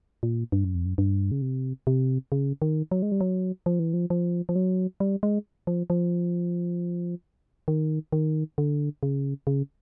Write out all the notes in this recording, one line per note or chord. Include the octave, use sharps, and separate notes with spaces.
A#2
G2
F#2
F2
F#2
G2
C#3
C3
C3
C#3
D#3
F#3
G#3
G3
F#3
F3
E3
F3
F3
F3
F#3
G3
G#3
F3
F3
D#3
D#3
D3
C#3
C#3